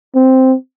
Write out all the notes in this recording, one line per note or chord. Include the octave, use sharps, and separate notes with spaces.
C4